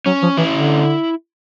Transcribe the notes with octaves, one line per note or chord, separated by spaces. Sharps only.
F#3 C#4
F3
E3 E4
D3